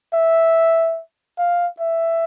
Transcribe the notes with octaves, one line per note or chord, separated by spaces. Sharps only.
E5
F5
E5